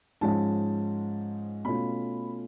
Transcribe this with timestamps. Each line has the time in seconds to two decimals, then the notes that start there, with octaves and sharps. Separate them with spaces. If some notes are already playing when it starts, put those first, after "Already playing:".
0.21 G#2 F3 G#3 C#4 A5
1.65 B2 A3 C#4 F4 B5